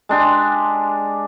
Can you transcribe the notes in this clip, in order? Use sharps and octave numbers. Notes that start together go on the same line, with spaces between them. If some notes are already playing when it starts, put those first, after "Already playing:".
G#3 D4 G4